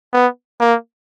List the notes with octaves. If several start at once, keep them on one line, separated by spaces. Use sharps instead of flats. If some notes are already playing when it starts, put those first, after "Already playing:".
B3
A#3